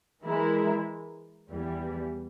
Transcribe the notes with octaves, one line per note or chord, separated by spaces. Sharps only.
E3 G#3 E4 A#4
E2 E3 G3